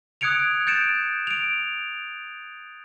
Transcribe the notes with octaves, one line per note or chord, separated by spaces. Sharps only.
D#6 F#6 G#6 C#7 D7 F7
G6 A6 C#7 D7 E7
D7 F7